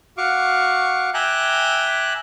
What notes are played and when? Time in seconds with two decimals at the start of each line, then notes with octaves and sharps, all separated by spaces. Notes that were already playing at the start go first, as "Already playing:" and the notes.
0.18 F#4 F5 C#6 D6
1.14 E5 G5 G#5 A#5 D6 F#6